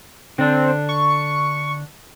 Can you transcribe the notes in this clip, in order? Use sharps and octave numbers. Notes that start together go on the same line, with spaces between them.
D3 C4 D4
C#6